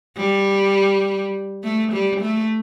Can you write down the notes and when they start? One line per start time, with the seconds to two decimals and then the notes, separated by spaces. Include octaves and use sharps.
0.17 G3
1.64 A3
1.93 G3
2.21 A3